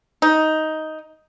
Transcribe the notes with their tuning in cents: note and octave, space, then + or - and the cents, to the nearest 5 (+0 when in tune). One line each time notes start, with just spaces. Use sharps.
D#4 +10